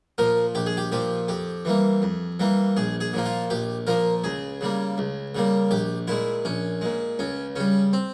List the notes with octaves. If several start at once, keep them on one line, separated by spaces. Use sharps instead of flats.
A#2 F3 A#4
A#1 G4
G#4
G4
A#2 F3 G4
F2 G4
E3 G3 A#3
F2
E3 G3 A#3
A#1 G#4
G#4
A#2 F3 A#3
F4
A#1 G4
A#2 F3 A#3 A#4
C#2 G#4
C#3 G3 A#3
C#2
C#3 G3 A#3
A#1 G4
A#2 G#3 E4
A#1 C#4
A#2 G#3
C#2 C#4
C#3 G3 C#4
C4